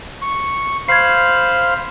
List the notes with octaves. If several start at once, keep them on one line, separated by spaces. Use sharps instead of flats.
C#6
C5 F5 B5 G#6 C7